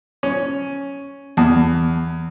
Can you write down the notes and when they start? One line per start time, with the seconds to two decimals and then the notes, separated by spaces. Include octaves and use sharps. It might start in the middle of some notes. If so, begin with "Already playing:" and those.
0.23 C#4
1.37 E2